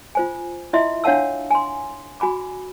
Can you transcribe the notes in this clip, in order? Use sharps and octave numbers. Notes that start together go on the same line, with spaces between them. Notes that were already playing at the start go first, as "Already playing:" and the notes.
F4 C5 G#5
E4 F4 D#5 E5 C6
D4 C#5 F5 F#5 A5 E6
G#5 C6
F#4 G#5 B5 D6